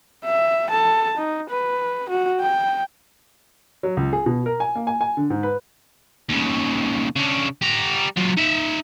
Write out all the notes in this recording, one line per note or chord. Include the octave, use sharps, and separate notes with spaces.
E5
A4 A5
D#4
B4
F#4
G5
F#3
C#2
G#4
B2
A#4
G#5
A#3
G#5
G#5
D3
G#2
B4
D#2 C#3
C#3 D4
G3 A#5
F#3 F4
D#4 E5